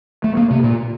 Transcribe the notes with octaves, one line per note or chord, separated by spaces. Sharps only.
A3
A#3
C3
A#2